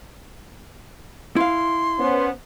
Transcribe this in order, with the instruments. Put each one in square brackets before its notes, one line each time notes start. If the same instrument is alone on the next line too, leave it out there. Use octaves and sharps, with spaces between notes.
[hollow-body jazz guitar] E4 F5 [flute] C6
[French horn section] B3 C#4 C5